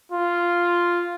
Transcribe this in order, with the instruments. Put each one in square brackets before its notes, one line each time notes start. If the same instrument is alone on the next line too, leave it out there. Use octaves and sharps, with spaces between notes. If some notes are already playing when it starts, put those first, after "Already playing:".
[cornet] F4